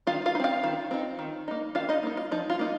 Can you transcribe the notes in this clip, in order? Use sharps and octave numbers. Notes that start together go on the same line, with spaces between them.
D#3 F4 F5
F4 F5
D#4
C4 F4 F5
D#3
C4 D#4
D#3
A#3 D#4
D#3 F4 F5
D#4 D#5
A#3 D#4
F4
F3 D#4
F4
A#3 D#4